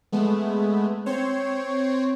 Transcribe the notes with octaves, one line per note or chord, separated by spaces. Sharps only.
G#3 A3 B3
C4 C5 C#5